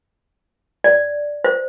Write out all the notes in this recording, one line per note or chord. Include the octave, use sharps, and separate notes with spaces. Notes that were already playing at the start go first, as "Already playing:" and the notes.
D5
C5